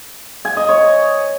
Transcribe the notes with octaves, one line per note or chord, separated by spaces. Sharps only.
G#5
D#5
C#5